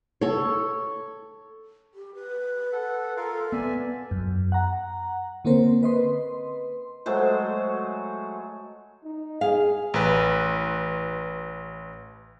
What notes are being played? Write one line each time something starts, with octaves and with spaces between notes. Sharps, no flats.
A4 C#5
G4
B4
A4 F#5
F4 A4 A#4 F5
B3 D5 E5 G#5
F#2
F#5 A#5
D3 A#3 C4 C#4 A#4 C5
B4 D#5 C6
F#3 G#3 A3 C5
D#4
G#4 F5
A1 B4